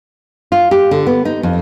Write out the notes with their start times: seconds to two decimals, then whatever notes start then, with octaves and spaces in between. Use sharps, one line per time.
0.52 F4
0.71 G4
0.91 D3
1.07 B3
1.25 D#4
1.43 F2